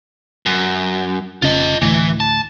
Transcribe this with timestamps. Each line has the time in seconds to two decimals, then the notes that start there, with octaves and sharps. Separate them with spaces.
0.46 F#2
1.42 F1 C#3 F4 D#5
1.82 D2 A2 E3
2.20 A5